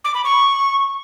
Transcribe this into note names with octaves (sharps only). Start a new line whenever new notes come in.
D6
B5
C#6